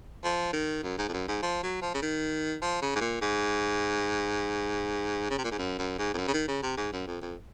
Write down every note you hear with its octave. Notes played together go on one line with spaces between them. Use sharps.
F3
D#3
F#2
G#2
F2
F#2
G#2
F3
F#3
F3
C#3
D#3
F3
C#3
G#2
A#2
G#2
C#3
C3
A#2
G#2
F#2
F#2
G#2
F2
F#2
C#3
D#3
C#3
C3
G#2
F#2
F2
F2